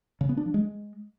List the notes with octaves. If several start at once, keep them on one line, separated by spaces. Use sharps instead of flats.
C#3
B3
D4
F3
G#3